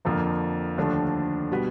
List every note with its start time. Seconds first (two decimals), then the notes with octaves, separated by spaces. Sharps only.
0.05 F2 D3 F3 A#3
0.78 D#2 D3 F3 A3 D4
1.52 B2 G3 B3